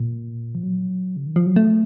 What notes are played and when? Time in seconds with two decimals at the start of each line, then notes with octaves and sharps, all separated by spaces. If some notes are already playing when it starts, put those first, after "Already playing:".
Already playing: A#2
0.55 F3
0.63 F#3
1.17 C#3
1.26 D#3
1.36 F3
1.46 F#3
1.56 A3